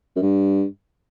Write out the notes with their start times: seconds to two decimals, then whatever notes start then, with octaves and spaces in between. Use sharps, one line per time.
0.16 F#2
0.22 G2